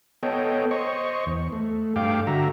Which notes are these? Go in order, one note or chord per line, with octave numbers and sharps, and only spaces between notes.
B3 A4 C#5 D#5 G5
C5 D#5 C#6
E2
A3
G2 A3 F5 G5 D6
D3 F#4 E5 A#5